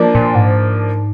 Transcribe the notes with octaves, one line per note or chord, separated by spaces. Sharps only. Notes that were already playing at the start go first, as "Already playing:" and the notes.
Already playing: F3 A#3 D4
A#2
G#2